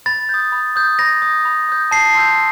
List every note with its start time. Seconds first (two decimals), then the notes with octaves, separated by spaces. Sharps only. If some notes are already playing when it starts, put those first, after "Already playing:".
0.06 B5 A6
0.29 D#6 G6
0.52 B5
0.76 D#6 G6
0.99 B5 A#6
1.22 D#6 G6
1.45 B5
1.69 D#6 G6
1.91 A5 C7
2.15 C6 E6 G6